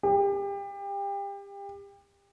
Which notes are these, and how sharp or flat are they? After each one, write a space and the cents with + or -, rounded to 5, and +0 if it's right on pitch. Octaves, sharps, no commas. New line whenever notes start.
G4 +30